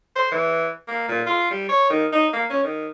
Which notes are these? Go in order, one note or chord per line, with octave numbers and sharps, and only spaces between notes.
C5
E3
A#3
A#2
F4
G3
C#5
D#3
D#4
A#3
C#4
D#3